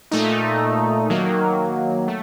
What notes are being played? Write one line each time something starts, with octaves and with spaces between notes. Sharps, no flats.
A#2 A3 D#4
D#3 F#3 A#3
A3